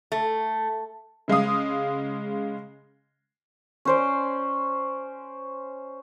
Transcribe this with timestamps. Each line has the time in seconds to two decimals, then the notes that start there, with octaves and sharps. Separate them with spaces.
0.12 A3
1.28 C#3 G#3 F5 D#6
3.85 C#4 C5 D5